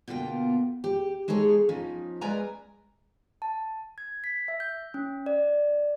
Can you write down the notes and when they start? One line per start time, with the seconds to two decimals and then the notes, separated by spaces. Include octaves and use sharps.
0.08 B2 D3 A#3 F4 G5
0.84 G4
1.28 G#3 D#4 G#4 A4 C#5
1.69 F3 C#4 D#4
2.21 G#3 A#4 B4 D5 G#5 A#5
3.42 A5
3.98 G#6
4.24 B6
4.48 E5
4.60 G6
4.94 C#4
5.26 D5